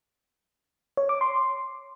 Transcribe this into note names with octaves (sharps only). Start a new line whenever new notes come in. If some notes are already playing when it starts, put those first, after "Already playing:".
C#5
D6
C6